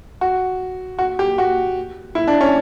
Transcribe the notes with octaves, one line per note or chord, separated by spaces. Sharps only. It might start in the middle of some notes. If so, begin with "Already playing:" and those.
F#4
F#4
G4
F#4
E4
D4
C#4